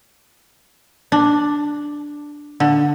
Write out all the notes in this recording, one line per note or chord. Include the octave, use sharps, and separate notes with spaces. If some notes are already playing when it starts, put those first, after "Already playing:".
D4
D3